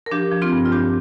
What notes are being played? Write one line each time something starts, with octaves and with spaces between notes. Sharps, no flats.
A#4
F3 D4 G4
F3
C4 F4
G2
F4
G2 D4 G4